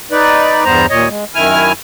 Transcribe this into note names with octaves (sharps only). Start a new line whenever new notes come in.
D#4 B4 D5
E2 G2 G3 B3 C5 A#5
D#2 A#2 C#5 D#5
G#3
F#2 D#3 E4 G#5 F6